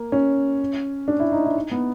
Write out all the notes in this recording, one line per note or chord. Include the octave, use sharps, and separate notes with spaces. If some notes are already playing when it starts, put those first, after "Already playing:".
Already playing: A#3
C#4
D4
E4
D#4
E4
D#4
B3